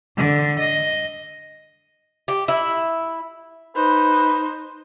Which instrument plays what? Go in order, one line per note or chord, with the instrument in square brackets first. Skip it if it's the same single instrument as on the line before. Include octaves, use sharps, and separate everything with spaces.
[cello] D3
D#5
[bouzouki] G4
E4
[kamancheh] D#4 C5 [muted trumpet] B4